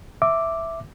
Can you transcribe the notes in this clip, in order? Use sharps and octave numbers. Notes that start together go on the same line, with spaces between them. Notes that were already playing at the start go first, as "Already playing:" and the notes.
E5 D6